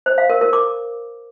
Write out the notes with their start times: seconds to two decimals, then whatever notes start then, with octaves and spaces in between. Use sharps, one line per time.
0.06 C5
0.18 F5
0.30 A#4
0.41 A#4
0.53 D6